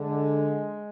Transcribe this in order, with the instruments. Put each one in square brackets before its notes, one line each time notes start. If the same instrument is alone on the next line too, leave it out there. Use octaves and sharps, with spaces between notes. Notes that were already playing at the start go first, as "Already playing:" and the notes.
Already playing: [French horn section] D3 [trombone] G#3